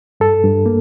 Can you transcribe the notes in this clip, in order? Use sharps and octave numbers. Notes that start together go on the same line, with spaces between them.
G2 A4
G2
A#3